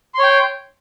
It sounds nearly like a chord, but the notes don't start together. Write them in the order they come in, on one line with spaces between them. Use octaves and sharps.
C6 C#5 G5